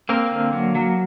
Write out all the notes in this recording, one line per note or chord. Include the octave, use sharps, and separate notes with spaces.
A#3 C4 A#4
D3
F#3
F#3